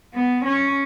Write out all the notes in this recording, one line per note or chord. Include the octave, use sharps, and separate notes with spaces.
B3
C#4